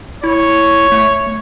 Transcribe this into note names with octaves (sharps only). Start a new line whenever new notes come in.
E4 C#5
A3